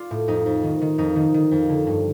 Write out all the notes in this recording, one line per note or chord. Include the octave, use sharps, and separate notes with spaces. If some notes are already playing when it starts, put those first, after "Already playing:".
Already playing: F4 D5
A2
F2 D#4
F2
D#3
D#3
F2 D#4
D#3
D#3
F2
D3
G2